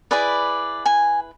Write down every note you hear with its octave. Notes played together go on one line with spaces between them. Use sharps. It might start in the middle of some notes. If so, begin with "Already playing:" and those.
E4 G#4 B4 D5
G#5